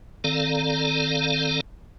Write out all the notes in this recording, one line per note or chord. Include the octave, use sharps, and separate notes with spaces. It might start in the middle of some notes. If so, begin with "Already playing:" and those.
D#3 C4 A4 D5 F5 A#5